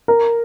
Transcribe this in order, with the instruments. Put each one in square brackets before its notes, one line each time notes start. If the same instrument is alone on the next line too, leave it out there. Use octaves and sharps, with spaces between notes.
[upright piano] A#4